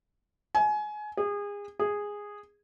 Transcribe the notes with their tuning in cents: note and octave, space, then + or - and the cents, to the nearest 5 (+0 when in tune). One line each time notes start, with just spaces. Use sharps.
G#5 +25
G#4 -30
G#4 -10